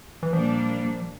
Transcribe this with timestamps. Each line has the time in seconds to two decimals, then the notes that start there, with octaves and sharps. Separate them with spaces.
0.23 E3
0.33 A#2 F3 G3 A#3 D4